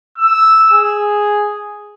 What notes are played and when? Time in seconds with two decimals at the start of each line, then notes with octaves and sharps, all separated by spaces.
0.18 E6
0.72 G#4